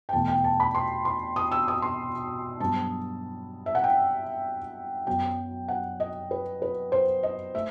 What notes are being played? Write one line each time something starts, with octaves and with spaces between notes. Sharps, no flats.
G5
E2 B2 A3 A5
G5
A5
B5
C6
C6
D#6
E6
D#6
C6
G2 F#3 B3 A5
E5
F#5
G5
F#2 F#3 B3 G5
F#5
D#5
B4
B4
C5
D#5
A3 E5